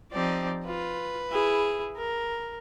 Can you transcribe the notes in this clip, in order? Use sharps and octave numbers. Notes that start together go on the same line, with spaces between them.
F3 C4 D#4 G4 D5
F4 B4
E4 G#4
A#4